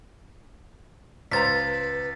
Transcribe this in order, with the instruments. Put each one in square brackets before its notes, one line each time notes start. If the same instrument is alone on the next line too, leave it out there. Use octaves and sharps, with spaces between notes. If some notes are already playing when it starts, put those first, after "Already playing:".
[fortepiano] C#2 C5 A#5 [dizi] B4 [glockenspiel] A6 B6